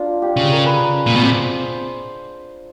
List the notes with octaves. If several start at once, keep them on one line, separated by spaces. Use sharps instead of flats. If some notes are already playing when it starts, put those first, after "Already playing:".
Already playing: D4 F4
G4
C#3 G#4
A#4
B4
A#2
B2
C3 C5